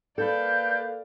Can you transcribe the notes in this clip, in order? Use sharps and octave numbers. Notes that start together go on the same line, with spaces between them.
A#3 A4 B4 D5 F5 G6